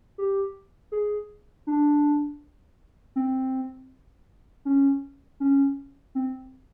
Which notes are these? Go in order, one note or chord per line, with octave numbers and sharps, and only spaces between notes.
G4
G#4
D4
C4
C#4
C#4
C4